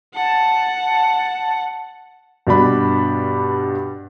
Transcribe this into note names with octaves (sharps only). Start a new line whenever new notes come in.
F#5 A5
G2 B2 D4 B5